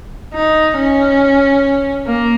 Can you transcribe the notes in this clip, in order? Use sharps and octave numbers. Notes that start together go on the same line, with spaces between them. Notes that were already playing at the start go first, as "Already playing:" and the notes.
D#4
C#4
A#3